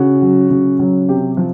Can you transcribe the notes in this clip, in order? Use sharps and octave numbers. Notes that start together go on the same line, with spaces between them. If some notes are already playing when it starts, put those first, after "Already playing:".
Already playing: C#3 F#4
F#3
C#3
F#3
C3 G4
F3